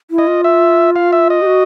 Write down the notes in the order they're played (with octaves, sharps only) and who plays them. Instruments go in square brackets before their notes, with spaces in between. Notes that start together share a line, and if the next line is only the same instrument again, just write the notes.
[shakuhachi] E4
[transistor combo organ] D#5
[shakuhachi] F4
[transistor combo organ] E5
F5
E5
D#5
[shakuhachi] G4
F#4